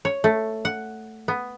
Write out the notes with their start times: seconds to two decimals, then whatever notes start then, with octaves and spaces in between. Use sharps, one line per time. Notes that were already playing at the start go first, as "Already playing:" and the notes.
0.05 C#5
0.24 A3
0.65 F#5
1.28 B3